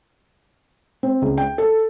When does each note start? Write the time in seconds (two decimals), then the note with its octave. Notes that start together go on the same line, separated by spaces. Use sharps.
1.03 C4
1.22 C#2
1.38 G5
1.58 A4